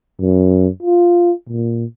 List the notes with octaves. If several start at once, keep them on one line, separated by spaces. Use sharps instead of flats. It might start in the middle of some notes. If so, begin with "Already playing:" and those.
F#2
F4
A#2